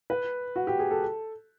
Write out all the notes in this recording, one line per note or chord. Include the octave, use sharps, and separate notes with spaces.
B4
F#4
G4
G#4
A4